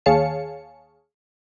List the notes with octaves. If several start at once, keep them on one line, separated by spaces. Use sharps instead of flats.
D#2 G#4 C#5 F5 A5 C#7